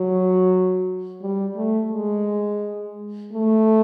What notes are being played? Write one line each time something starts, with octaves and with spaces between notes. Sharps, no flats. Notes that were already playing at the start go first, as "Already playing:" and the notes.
Already playing: F#3
G3
A3
G#3
A3